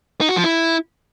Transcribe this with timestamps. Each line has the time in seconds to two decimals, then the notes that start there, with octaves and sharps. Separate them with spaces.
0.21 D#4
0.29 F#4
0.36 F3
0.44 E4